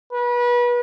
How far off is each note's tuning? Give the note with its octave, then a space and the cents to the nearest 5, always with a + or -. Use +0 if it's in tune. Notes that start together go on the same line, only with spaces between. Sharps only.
B4 -30